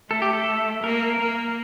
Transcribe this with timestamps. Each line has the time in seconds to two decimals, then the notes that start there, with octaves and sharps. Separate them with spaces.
0.10 A3 A4
0.22 G4
0.33 A4
0.83 A#3 A#4
1.20 A#3